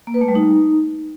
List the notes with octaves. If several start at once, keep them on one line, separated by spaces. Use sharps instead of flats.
A#3
B4
A3
G3
D#4